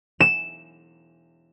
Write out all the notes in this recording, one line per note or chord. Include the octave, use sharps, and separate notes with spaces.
E7